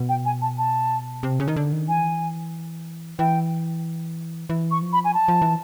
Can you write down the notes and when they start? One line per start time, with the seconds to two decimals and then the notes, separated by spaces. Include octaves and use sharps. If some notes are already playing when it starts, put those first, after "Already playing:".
Already playing: B2
0.09 G5
0.25 G#5
0.42 A5
0.58 A5
1.23 C3
1.40 C#3
1.48 D#3
1.56 D3
1.73 D#3
1.88 E3 G#5
3.19 E3 G5
4.49 E3
4.71 C#6
4.82 F3
4.93 B5
5.04 G#5
5.14 A5
5.28 F3
5.42 E3